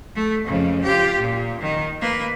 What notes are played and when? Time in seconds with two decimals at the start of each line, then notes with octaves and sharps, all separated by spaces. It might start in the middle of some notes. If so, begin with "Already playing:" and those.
0.16 A3
0.45 F2 C#3
0.83 F4 G4
1.20 A#2
1.61 D#3
2.01 A#3 B4